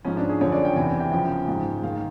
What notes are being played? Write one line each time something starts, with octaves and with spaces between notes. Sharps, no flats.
G#2 F3 C#4
D4
G#4
F#2 D3 F3 C#5
D5
G5
E2 C3 E3 G#5
G5
F#2 C#3 F3 G5
G#2 F3
G#2 D#3 F5